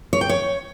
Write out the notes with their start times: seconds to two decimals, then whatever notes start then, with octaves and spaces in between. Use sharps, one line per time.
0.13 C#5
0.21 G5
0.29 C#5